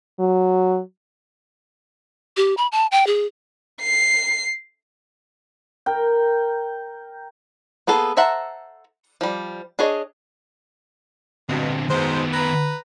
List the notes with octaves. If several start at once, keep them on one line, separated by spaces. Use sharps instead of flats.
F#3
G4
B5
A5
G5
G#4
C7
A#4 G5
A#3 B3 G#4 A4
A4 C5 E5 F#5 A#5
F3 G3
D4 G#4 C#5 D#5
G2 B2 D3 C4
G#2 B2 D#3 B3 C5
B4 A#5